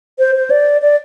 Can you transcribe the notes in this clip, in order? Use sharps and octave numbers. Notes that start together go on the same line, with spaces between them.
C5
C5
D5
D5